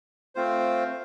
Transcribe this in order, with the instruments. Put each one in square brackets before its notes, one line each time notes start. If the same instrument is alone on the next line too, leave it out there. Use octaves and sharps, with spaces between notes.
[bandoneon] A3 C4 F4 C5